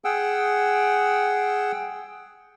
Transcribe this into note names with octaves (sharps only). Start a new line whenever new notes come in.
G#4 F#5 G5 E6